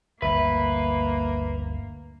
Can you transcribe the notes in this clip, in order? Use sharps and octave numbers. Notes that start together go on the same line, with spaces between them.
G1 D2 A#3 B4 E5